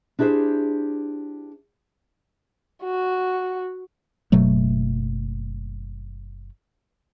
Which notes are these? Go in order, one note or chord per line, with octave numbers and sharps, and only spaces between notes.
D4 E4 G4 G#4 C5
F#4
F#1 B2 F#3 A3